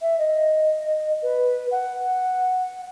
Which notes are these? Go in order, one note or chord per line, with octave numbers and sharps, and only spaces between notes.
E5
D#5
B4
F#5